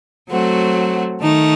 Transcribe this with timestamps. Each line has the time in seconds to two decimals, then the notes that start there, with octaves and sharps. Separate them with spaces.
0.29 F#3 A3 C4 F#4
1.21 D#3 A3 D#4